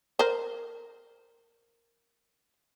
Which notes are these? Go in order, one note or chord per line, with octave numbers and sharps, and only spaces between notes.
A#4 C5